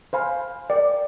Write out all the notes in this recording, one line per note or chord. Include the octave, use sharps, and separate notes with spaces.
C5 F5 G#5 B5
A#4 D5 G5